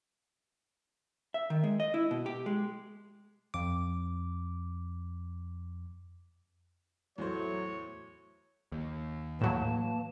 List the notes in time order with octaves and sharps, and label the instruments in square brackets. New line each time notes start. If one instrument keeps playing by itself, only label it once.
[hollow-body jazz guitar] E5
D#3
G#3
D#5
E4
B2
G4
G#3
[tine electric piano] F2 D6
[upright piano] E2 A2 C5 [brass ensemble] F#3 A3 [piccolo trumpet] C#5
[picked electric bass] D#2
[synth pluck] A2 F#3 [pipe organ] E3 A#3 A5